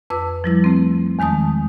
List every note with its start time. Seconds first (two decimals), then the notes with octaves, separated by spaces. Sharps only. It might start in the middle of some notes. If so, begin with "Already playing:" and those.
0.10 F2 B4 D6 E6
0.44 F3 G3 E4
0.64 A3 C4
1.19 E2 D#3 G#3 A5 D#6